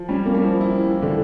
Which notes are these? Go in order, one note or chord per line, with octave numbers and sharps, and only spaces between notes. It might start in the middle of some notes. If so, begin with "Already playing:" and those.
Already playing: F3
G3 C#4
A#3
G3
F3
E4
E3
D3